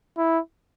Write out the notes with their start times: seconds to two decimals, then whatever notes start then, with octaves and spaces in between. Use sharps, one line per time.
0.18 E4